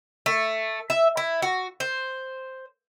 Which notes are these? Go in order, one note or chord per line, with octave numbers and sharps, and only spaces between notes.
A3
E5
E4
F#4
C5